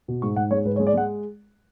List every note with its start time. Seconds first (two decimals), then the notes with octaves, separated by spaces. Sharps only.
0.08 B2
0.22 G#2 C#6
0.36 G#2 F#5
0.51 G#3 C#5
0.65 G#2 B4
0.76 C#5
0.80 G#3
0.87 D5
0.94 G#3 F#5